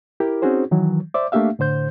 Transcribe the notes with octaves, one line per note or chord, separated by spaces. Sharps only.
E4 G4 A#4
C4 C#4 D#4 F#4 G#4 C5
D#3 E3 F#3
C5 D5 E5 D6
A3 A#3 D4 G4 E5 F5
A2 D3 C5 G6